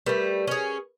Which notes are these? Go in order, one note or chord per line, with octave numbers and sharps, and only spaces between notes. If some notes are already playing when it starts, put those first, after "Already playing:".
G3 A3 A#4 B4 B5
C#4 G#4